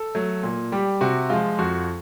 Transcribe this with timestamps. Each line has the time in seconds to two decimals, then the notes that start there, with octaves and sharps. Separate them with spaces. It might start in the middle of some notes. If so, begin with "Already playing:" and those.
Already playing: A4
0.15 F#3 A3
0.43 A#2
0.72 G3 G4
1.01 C3 F#4
1.30 F3 G#3 F4
1.58 F2 F#4